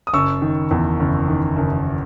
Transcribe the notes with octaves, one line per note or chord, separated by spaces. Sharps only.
D#6
F#1 C#6 E6
D#3
E2
F#1
D#3
F#1